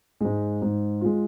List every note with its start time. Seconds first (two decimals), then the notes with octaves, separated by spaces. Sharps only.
0.21 G#2 G#3
0.62 G#2
1.01 G#3 F4